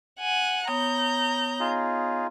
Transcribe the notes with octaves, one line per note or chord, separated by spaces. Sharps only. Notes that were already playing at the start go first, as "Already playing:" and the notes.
F#5 G#5
B3 C#5 A#5 D#6 G6
D#4 F4 G#4